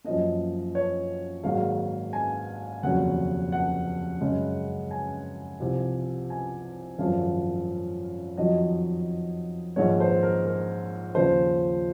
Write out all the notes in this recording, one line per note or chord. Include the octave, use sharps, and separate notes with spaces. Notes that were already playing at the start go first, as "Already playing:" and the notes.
F#2 F3 A#3 D#5
C#5
G#1 G#2 F#3 A#3 F5
G#5
F1 D#2 C#3 F#3 F#5
F#5
F#2 C#3 G#3
G#5
C2 C3 F3
G#5
G#1 F#2 F3 F5
F2 D#3 F#3 D#5
A#1 G#2 D#3 G#3 C#5
C5
A#4
A#4
D#2 C#3 F3 C5